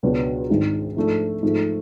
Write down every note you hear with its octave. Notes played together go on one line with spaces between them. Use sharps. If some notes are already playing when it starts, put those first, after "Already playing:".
C#2 B2 F#3 B3 D4
G#1 G#2 G#3 D4
G#2 F3 A3 D4
G#2 F3 A3